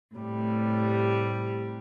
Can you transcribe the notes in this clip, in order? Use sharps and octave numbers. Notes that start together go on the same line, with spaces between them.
A2 C3 G3